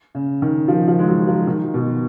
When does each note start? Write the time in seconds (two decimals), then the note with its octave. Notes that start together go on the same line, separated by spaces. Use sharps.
0.15 C#3
0.42 D#3
0.68 F3
0.88 F3
0.99 G#3
1.08 F#3
1.28 F3
1.47 D#3
1.74 B2